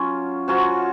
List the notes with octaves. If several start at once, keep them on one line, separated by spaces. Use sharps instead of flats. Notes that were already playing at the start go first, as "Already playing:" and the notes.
Already playing: F#3 C#4 F4
F#3 C#4 F4 F#4